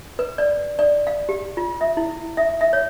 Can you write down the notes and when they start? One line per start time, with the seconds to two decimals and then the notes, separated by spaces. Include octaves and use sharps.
0.19 B4
0.38 D5
0.79 D5
1.07 F5
1.29 G4
1.57 F4
1.81 E5
1.97 E4
2.37 E5
2.61 E5
2.73 C#5